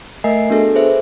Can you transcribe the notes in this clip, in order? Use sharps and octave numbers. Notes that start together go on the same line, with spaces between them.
A3 A#4 D#5 E5 G#5 C7
B3 D4 F#4 G#4 A4
G#4 B4 C5 E5